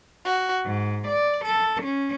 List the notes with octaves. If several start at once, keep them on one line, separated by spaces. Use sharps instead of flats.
F#4
G#2
D5
A4
C#4